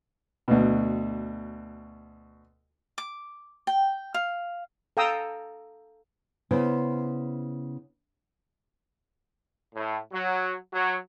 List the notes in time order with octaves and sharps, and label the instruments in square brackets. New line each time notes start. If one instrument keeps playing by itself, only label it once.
[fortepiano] D2 B2
[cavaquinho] D6
G5
F5
[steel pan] A4 F5 G5 A#5 D#6 E6
[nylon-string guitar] C#3 B3 E4 C5
[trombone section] A2
F#3
F#3